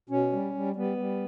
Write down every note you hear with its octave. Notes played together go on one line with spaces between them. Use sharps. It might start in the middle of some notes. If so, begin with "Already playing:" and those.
B2 C#4
G3
G3
G3 B3
G3